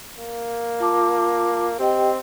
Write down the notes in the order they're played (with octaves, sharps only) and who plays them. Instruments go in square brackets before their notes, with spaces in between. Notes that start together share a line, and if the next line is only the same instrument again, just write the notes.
[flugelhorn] A#3
[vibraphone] F4 A5 D6
[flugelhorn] C4 [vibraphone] G4 D#5 G5